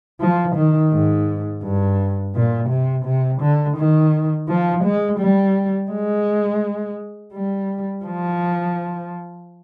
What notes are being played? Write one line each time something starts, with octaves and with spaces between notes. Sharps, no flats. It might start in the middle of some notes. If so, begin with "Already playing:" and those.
F3
D#3
G#2
G2
A#2
C3
C3
D3
D#3
F3
G#3
G3
G#3
G3
F3